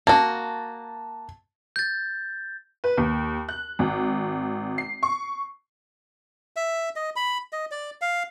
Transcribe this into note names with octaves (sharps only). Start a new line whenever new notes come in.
A#3 F#4 A5
G6 A6
B4
D#2
F#6
G#1
C7
C#6
E5
D#5
B5
D#5
D5
F5